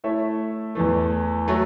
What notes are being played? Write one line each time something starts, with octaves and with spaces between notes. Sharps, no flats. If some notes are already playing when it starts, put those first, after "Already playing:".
A3 E4 C#5 E5
E2 E3 A3
F#3 A3